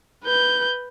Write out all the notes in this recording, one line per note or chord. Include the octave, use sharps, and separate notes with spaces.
B4 G6